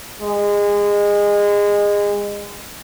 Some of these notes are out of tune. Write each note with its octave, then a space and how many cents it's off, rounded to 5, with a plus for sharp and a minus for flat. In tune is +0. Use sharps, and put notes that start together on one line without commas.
G#3 -25